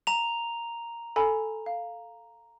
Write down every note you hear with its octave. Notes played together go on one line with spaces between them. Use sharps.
A#5 F7
A4 G#5 B5
F5